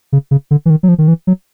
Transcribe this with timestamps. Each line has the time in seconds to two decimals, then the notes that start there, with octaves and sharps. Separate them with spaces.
0.12 C#3
0.31 C#3
0.51 D3
0.66 E3
0.70 D#3
0.83 F#3
0.88 F3
0.98 D#3
1.08 E3
1.27 F#3